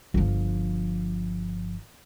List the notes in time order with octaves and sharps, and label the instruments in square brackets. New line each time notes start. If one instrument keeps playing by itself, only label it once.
[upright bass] G1 F3